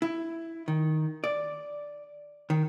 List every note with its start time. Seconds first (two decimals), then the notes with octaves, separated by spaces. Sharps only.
0.02 E4
0.68 D#3
1.24 D5
2.50 D#3